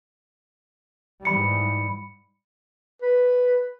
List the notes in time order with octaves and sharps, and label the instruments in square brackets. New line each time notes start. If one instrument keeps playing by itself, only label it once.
[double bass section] G#2 E3 G3 [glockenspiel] B5 C#7
[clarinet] B4